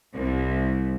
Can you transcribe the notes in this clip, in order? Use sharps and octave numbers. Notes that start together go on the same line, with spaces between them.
C2